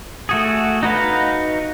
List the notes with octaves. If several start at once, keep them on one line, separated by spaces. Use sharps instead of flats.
A3 F#4 G#4
D#4 F#4 B4 F5